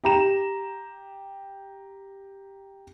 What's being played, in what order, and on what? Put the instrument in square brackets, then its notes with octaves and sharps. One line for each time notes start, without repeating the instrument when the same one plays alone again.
[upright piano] G4 A#5 E7